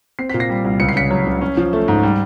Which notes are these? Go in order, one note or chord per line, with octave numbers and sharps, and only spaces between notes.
C4 C7
A#2 B6
A#6 C7
G3
C2
C#2 C#7
C7
C#3 B6 C#7
F#3
C#2
C#4
F3
A3
G#2
G3